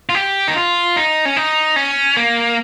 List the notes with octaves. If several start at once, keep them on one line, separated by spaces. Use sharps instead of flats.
F4
G4
D#4
F4
D#4
C#4
D#4
C#4
A#3